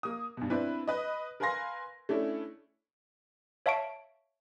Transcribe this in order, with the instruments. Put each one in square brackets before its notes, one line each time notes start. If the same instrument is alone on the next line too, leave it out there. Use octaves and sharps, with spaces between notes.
[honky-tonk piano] A#3 D#6
G2 B2
C4 D4 E4 B4
B4 D#5
A#4 B4 F5 G#5 C6 A#6
A3 C#4 D4 E4
[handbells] C#5 E5 F5 A5 C#6 D7